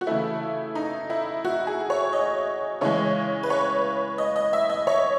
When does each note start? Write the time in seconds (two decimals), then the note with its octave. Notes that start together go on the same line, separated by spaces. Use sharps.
0.01 F#4
0.07 C#3 E3 A3 E4
0.75 D#4
1.10 E4
1.45 F#4
1.67 G#4
1.90 C#5
2.13 D#5
2.81 C#3 E3 G#3 C#5
3.43 B4
3.50 C#5
4.18 D#5
4.36 D#5
4.53 E5
4.69 D#5
4.87 C#5